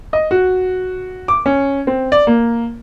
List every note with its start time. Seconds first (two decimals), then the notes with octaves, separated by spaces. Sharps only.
0.13 D#5
0.31 F#4
1.28 D6
1.46 C#4
1.87 C4
2.12 D5
2.27 A#3